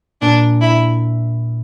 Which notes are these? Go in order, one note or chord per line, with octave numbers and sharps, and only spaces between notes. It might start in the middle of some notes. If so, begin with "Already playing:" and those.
A#2 D4
E4